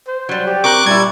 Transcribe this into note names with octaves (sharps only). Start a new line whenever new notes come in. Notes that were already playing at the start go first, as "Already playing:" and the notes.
C5
F#3 G3
G4
C4 A#4 C#6 D6 F#6
A#2 G3 E4 G#6